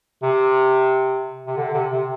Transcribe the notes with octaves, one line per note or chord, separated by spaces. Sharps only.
C3
C3
D3
C3
C3